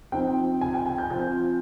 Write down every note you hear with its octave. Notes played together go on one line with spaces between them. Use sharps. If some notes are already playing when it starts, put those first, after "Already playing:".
F3 C4 D#4 G5
G#5
G5
G#5
G6
F3 C4 F4 G6